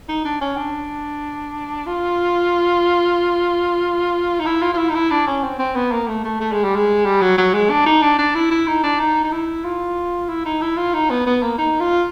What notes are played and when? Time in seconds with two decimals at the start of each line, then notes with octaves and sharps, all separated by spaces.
0.09 D#4
0.25 D4
0.41 C#4
0.57 D4
1.87 F4
4.39 D#4
4.46 E4
4.62 F4
4.74 F4
4.78 E4
4.89 D#4
4.94 E4
5.11 D4
5.27 C#4
5.43 C4
5.59 C4
5.75 B3
5.92 A#3
6.08 A3
6.24 A3
6.40 A3
6.52 G#3
6.64 G3
6.76 G#3
7.05 G3
7.21 F#3
7.38 F#3
7.54 G#3
7.70 D4
7.86 D#4
8.02 D4
8.18 D4
8.35 E4
8.51 E4
8.67 D#4
8.83 D4
8.99 D#4
9.24 D#4
9.32 E4
9.65 F4
10.29 E4
10.46 D#4
10.62 E4
10.78 F4
10.94 D#4
11.10 B3
11.26 B3
11.42 A#3
11.58 D#4
11.80 F4